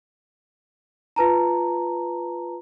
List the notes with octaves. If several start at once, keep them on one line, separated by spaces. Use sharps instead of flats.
F4 B4 A5 A#5